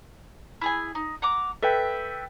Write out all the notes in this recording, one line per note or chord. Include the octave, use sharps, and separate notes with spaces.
E4 G#4 G#5
D#4
F#5 A#5 D6
A4 B4 E5 G5